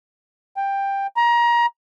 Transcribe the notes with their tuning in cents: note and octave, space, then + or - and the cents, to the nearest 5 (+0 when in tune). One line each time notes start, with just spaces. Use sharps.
G5 +10
A#5 +25